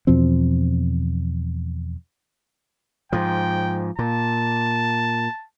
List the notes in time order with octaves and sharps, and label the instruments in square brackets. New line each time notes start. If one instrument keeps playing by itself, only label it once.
[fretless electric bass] E2 B2 F3 C4
[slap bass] G#2 F3 [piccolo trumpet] G5
[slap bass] A#2 [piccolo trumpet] A5